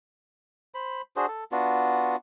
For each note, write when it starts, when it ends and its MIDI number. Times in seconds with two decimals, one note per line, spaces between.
0.74 1.02 72
0.74 1.02 83
1.16 1.26 62
1.16 1.26 66
1.16 1.26 68
1.16 1.26 72
1.28 1.44 69
1.52 2.16 59
1.52 2.16 62
1.52 2.16 65
1.52 2.16 66